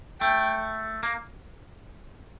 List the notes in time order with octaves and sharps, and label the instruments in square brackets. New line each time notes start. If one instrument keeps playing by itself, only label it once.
[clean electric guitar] A3 [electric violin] G5
[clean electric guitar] A#3